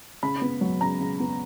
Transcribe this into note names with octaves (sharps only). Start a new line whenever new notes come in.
C#3 B5
B3
F#3
C#3 A#5
C#3
B3